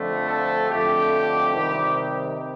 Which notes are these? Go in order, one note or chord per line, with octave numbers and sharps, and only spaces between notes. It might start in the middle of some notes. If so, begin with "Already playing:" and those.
Already playing: F2 D3 F3 A3
A4
F2 D3 A3 G4
C3 D#3 G3 C4